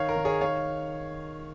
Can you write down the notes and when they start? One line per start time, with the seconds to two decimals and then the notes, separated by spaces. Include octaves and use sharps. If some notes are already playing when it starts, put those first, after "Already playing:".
Already playing: D#3 C#5 F5
0.09 A#4
0.16 D#3
0.25 G#4 C#5
0.41 D#3 C#5 F5